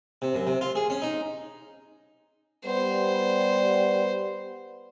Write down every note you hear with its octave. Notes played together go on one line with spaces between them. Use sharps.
C3
F#2
C3
F4
G#4
C#4
D#4
G3 B3 C5